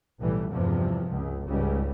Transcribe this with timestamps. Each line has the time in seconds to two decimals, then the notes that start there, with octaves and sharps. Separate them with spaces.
0.19 B1 A2 E3 G3 A3
0.50 E2 G2 C3 F3
1.09 C#2
1.48 C#2 G#2 C#3 G3